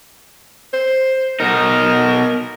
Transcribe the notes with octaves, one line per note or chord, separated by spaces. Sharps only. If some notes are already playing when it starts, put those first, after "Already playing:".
C5
B2 D#4 A#4